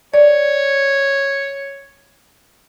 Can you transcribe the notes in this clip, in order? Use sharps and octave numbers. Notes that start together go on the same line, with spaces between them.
C#5 D5